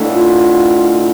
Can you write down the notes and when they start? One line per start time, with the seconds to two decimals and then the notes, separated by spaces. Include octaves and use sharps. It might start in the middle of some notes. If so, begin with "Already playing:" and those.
Already playing: A2 D3
0.13 F4